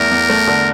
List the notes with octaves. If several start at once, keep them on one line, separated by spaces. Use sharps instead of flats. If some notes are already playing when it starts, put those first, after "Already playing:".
Already playing: E2 A3 E4 A#4
E2
A3
D3